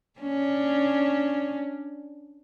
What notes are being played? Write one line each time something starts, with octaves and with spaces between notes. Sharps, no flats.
C#4 D4